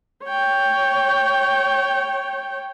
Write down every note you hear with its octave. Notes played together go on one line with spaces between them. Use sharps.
C#5 G5